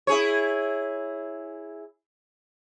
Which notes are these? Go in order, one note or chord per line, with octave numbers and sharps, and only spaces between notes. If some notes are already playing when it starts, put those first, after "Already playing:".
E4 G#4 C#5